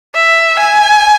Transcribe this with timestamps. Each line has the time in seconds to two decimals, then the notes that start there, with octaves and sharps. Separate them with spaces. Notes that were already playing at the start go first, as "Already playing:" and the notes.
0.15 E5
0.59 G#5